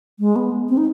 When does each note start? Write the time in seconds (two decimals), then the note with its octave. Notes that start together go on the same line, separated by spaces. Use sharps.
0.19 G#3
0.36 B3
0.69 C4
0.77 D#4